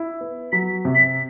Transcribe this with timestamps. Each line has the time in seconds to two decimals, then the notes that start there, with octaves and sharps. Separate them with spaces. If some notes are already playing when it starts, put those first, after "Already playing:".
Already playing: E4
0.21 B3
0.52 F#3 B6
0.85 C3
0.95 B6